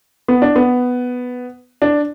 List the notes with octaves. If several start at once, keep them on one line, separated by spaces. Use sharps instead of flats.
B3
D4
B3
D4